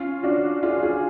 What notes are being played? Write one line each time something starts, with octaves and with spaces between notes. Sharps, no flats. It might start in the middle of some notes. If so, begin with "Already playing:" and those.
Already playing: C#4 F4
D4 F#4
F4 G#4
F4 G#4